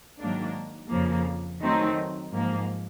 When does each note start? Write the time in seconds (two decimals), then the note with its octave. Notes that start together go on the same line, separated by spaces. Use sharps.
0.19 G#2 D#3 F#3 A#3 D4
0.90 F2 C#3 F3 A#3
1.61 D#3 F#3 A3 C4 D#4
2.32 G#2 F3 A#3